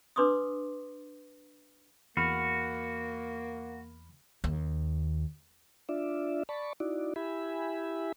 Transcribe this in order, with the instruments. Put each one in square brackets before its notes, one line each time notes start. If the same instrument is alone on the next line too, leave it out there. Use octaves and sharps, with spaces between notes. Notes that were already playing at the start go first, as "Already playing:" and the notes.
[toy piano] D4 B4 C6 D6 D#6
[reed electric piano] E2 B5 F6 [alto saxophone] A#3 [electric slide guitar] F#4
[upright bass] D#2
[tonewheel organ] D4 F4 D5 E5
D5 A5 B5 C#6
D#4 E4 F#4 D5
E4 G4 E5 G#5 B5